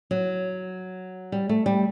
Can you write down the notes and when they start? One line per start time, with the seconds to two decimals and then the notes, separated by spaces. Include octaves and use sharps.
0.11 F#3
1.32 G3
1.49 A3
1.66 G3